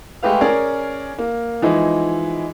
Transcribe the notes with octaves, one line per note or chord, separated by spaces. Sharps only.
G#3 A3 G4 B4 F5
C#4 G#4 A#4 D5
A#3
E3 F3 G#3 D#4 E4